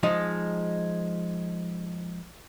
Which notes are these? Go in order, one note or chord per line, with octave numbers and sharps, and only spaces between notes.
F3 G#3 D#4